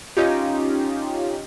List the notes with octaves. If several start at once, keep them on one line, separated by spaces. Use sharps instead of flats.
C#4 D#4 F4 G4